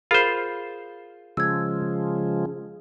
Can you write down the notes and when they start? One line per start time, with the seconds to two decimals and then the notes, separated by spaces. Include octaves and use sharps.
0.11 F4 G#4 A#4 C5 B5
1.37 C#3 F3 G#3 E6 G#6